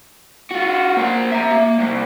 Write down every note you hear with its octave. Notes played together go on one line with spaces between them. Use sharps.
F4 F#4
A#3 C5
E5 A#5
A#3
C3 G3